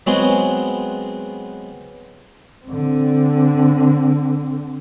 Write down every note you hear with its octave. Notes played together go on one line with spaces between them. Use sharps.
F#3 G#3 B3 C4 F#4 G#4
D3 C4